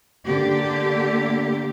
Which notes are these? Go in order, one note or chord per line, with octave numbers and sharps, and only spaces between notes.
D3 A#3 G4